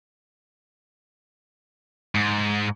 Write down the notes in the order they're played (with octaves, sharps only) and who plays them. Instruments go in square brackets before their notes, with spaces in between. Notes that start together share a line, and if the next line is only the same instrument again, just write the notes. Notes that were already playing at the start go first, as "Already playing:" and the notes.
[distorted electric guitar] G#2